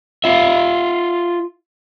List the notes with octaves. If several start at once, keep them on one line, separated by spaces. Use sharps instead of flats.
F4 E5